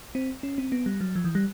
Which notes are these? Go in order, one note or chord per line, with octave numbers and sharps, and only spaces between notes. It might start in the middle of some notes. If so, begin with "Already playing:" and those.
C4
C#4
C4
B3
G3
F#3
F3
E3
G3